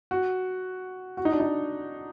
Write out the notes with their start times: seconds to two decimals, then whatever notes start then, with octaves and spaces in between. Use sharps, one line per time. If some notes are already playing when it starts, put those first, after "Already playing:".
0.11 F#4
1.17 F#4
1.25 D#4
1.32 D4
1.40 D#4